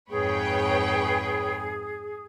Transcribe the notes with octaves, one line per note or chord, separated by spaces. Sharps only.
F2 G#2 G#4 B4 C#5 G5